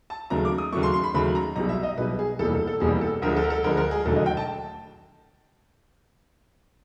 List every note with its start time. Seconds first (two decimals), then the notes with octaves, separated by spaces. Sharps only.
0.10 A5
0.30 D#2 C#3 F#3 A3 A#5
0.45 D6
0.58 D#6
0.72 D#2 C#3 F#3 A3 C#6
0.83 C6
0.94 C6
1.03 B5
1.14 D#2 C#3 F#3 A3 B5
1.35 A#5
1.56 B1 B2 G3 A#5
1.69 E5
1.83 D#5
1.97 B1 B2 G3 B4
2.19 G#4
2.39 F1 E2 B2 G3 A#3 A4
2.53 A4
2.67 A4
2.80 F1 E2 B2 G3 A#3 G#4
3.01 A4
3.22 D2 D3 F3 G#3 A#4
3.36 A4
3.44 A#4
3.50 A4
3.63 D2 D3 F3 G#3 A#4
3.77 A#4
3.91 G#4
4.05 E1 D#2 D3 F#3 A3 A4
4.16 D#5
4.26 G5
4.37 A5